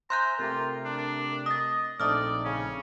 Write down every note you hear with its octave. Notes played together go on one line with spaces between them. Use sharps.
C5 E5 G#5 A#5 C6 F#6 G6
C3 A3 F4 G4 A#4
D4
D#5 D#6 A6
A#1 A3 C4 D#4 D5 D#6 F6
C#3 C#4